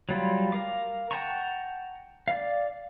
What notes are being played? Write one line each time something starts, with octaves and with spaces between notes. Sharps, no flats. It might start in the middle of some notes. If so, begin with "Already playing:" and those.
F#3 G3 F4
A#4 F5 D6
F#5 G5 A5 A#5 C#6
D5 F5